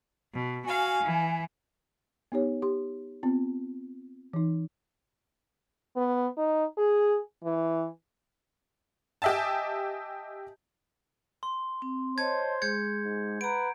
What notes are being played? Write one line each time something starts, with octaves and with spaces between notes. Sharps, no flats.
B2
F#4 F5 G#5
E3
B3 D#4 G4 C#5
G4 C6
B3 C4 F4
E3 D#4
B3
D#4
G#4
E3
G4 D#5 E5 G#5 A5
C6
C4
C5 C#5 D#5 A5 G#6
G#3 G#4 G6 G#6 C#7
G#2
B4 F#5 A#5 D7